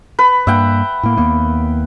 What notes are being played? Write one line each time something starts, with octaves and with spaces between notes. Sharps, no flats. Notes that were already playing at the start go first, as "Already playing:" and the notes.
B4
G2 A#3 E5 F#5 G5
A2 A#3
D#2 A#3 B3